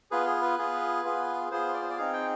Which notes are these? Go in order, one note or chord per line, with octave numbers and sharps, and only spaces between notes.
B3 F4 G#4 B4
G#4
B4
B3 F4 G#4
B3 F4 G#4
B3 F4 G#4 C5
D5
C5
D5
C4 D#4 G#4 F5
G5